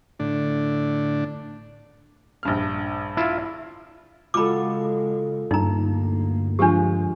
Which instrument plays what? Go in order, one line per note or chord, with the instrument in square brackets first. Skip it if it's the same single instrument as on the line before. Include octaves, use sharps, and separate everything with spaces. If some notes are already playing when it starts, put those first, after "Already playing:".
[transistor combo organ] A2 D3 D4
[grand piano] A#1 G2 F6
[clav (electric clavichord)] E4 F4
[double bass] C#3 G#3 [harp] F4 F#4 A4 [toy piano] B5 D6
[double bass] D2 A#3 [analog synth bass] G2 [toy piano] D#4 A#5
[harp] F3 G#3 F4 [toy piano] D4 G4